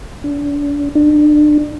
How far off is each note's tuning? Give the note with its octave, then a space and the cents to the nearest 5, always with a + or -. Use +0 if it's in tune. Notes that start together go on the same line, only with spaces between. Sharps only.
D4 -35
D4 +30